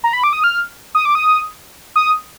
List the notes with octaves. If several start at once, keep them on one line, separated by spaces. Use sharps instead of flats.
A#5
B5
D6
D#6
F6
D#6
D6
D#6
D#6